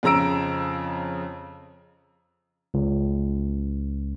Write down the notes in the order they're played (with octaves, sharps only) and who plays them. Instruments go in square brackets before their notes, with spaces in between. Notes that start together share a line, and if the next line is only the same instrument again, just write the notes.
[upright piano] F2 C#3 A#5 E6 D7
[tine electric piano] C#2